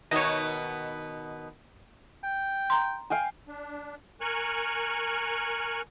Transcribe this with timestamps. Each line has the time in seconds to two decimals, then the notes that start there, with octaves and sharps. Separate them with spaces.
0.11 B2 D#3 B3 C#5 D#5
2.23 G5
2.70 A#5 C6
3.10 F5 G5 G#5
3.47 D4
4.21 A#4 G#5 C#6 F6 F#6